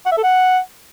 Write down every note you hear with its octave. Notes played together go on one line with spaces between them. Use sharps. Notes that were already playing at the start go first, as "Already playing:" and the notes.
F#5
E5
A4
F#5